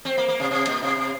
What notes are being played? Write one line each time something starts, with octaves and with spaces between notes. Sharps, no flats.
C4
A#3
A#3
C3
C3
A#2
C3
C3